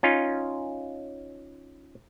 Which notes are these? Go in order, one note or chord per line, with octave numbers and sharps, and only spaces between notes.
C#4 D#4 F4